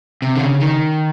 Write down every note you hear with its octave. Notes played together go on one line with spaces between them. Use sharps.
C3
D3
C#3
D#3